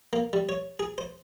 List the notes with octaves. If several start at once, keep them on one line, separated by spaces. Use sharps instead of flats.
A#3
G3
C#5
G#4
C5